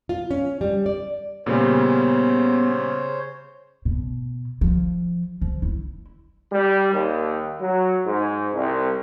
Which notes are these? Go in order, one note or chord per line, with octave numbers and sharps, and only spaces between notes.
F4
C#4
G3
D5
A#2 C#3 G3 B3 C5 C#5
B2
F3
F3
E4
G3
D#2
F#3
G#2
C2